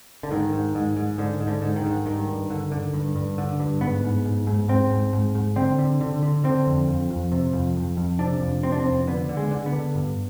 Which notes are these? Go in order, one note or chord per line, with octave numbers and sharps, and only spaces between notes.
D3
G#2 D#3
G#2
G#2
G#2
G#2 D3
G#2
D3
G#2
D#3
G#2
G2 D#3
G2
D3
D3
G2
G2
D3
G2
G#2 B3
G#2
G#2
G#2
G#2 C4
G#2
G#2
G#2
D3 C4
D3
D3
D3
D3 C4
F2
F2
F2
C3
F2
F2
F2
C3 D4
F2
C3 C4
D4
C4
F2
D3 B3
D3
G#3
D3
B3
D3
G2